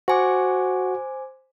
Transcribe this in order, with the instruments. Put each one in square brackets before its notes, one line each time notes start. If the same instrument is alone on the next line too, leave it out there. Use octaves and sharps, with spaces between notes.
[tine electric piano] F#4 [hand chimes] C5 G#5 D6